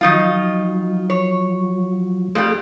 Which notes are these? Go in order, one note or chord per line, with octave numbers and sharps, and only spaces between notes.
D#3 F3 F#3 D#4 F4
C#5
F2 G3 A3 G#4 F5